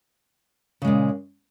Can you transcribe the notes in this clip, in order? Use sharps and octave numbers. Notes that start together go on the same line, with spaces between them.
A#2 C#3 G#3